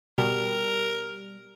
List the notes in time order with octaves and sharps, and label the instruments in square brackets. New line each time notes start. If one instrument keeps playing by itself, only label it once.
[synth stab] B2 [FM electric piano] G3 [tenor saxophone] A#4